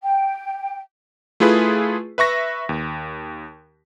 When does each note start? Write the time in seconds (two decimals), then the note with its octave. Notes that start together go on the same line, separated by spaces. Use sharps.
0.03 G5
1.40 A3 E4 F4 G#4 B4
2.18 B4 E5 C#6 A#6
2.69 D#2